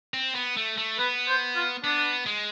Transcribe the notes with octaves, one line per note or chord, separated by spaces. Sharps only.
C4
B3
A3
A3
B3 B4
C5
F4
B3 D4
G#3